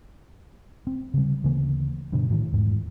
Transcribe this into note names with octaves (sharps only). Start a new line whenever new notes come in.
C4
C#3 G3
D2 C#3 E3 A#3
G2 B2 D3
A2 D#3 E3
E2 G#2 E3